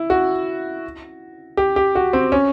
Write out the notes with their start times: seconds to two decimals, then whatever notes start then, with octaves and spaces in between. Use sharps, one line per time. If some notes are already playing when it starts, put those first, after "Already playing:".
Already playing: E4
0.10 F#4
1.57 G4
1.76 G4
1.95 F#4
2.13 C4
2.32 C#4